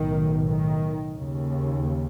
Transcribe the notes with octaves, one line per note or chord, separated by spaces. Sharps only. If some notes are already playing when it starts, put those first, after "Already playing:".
Already playing: B1 A2 D#3
D#3
D#2 C#3